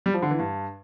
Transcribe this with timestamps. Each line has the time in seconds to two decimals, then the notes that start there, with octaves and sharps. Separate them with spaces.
0.06 G3
0.14 F3
0.22 D3
0.31 E3
0.39 G2